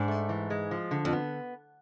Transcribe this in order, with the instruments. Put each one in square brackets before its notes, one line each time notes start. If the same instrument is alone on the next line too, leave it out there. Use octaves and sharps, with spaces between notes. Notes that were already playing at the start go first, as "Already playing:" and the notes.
Already playing: [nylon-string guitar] G#2 [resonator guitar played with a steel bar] D4
[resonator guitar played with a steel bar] A3
E3
G#3
F3
D3
[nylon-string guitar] F2
[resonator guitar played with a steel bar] B3